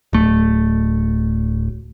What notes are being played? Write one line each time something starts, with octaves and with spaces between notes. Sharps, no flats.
D1 A3